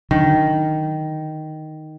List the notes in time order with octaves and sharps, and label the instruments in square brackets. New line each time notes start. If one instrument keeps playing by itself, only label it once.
[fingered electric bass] D3 F#3 [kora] D#3